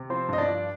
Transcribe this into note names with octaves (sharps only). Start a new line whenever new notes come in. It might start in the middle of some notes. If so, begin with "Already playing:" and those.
Already playing: C3
F3 C4 C5
G2 D#5
D4 D5
F3